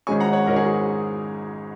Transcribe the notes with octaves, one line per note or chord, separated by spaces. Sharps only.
G#1 G#2 G#3 C#4 G#5 C#6
F#5 A#5
C#5 F#5
G#1 G#2 G#3 C#4 A#4 D#5
G#4 C#5
G#4